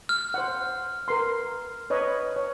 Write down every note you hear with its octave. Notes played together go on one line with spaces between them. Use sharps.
F6
C5 F#5
A#4 B4 C6
B4 C#5 D#5
C#5